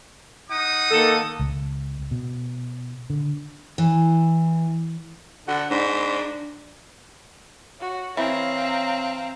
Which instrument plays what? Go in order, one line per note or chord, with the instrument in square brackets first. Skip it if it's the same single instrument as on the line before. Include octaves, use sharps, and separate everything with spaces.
[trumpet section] D#4 F#5 D#6
[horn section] D#3 A#3 A4
[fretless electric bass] C#2
B2
D3
[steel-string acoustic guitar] E3
[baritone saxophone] D3 [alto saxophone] F#5
[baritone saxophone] G#2 [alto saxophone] D4
[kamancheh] F#4 [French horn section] C#5
[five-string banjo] E3 [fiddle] C4 [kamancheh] F5 A#5